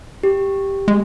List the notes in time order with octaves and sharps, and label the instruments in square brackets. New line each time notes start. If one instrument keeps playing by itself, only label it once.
[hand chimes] G4
[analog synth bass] G#3